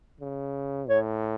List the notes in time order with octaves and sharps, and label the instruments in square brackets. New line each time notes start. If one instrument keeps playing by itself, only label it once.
[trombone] C#3
[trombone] A2 [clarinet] C#5